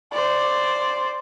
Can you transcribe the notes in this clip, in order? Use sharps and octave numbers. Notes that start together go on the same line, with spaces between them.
C5 D5